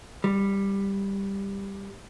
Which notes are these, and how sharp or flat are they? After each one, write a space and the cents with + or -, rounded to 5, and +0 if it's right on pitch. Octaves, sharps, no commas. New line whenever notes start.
G3 +10